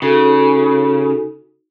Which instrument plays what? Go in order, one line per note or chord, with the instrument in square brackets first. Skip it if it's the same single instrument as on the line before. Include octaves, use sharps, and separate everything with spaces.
[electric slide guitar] C#3 [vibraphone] D#4 F#4 A4